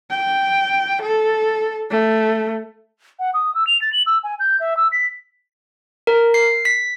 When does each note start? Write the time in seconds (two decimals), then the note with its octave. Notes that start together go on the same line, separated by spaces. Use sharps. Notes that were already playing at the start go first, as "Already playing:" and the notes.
0.11 G5
1.02 A4
1.91 A3
3.19 F#5
3.34 D#6
3.55 E6
3.67 F7
3.82 A6
3.93 F#7
4.06 E6
4.24 G#5
4.40 G6
4.60 E5
4.77 E6
4.92 B6
6.07 A#4
6.34 C7
6.65 B6